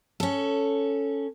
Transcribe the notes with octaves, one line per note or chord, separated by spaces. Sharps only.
C#4 A4